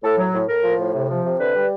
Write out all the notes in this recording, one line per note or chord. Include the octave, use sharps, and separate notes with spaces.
A2 A4
F#3
A2
A2 A#4
F3
A2
C3
F3
C3
D3 B4
G3